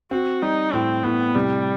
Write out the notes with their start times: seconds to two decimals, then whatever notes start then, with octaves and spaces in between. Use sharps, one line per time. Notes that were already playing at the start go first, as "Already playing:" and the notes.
0.11 C4 F#4
0.42 G3 D#4
0.73 A2 C4
1.03 A2 B3
1.35 C3 G3